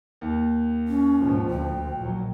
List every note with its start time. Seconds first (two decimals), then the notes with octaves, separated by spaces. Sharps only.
0.21 D#2
0.88 C#4
1.19 G#2 B2 F3
1.50 D2 G5
1.98 A#1 F#3